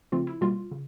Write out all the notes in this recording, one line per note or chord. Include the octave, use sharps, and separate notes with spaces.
C#3 F3 A3 C4 F4
E4
B2 G3 A#3 F4
C#3